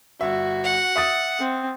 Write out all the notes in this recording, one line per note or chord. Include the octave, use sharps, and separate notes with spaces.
G1 F#4 E5
F#5
E5 D#6 A6
C4